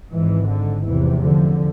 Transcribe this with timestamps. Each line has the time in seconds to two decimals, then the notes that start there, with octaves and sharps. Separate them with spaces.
0.12 G#1 G#2 E3
0.48 D3
0.85 F1 E2 C3 E3
1.22 D3 F3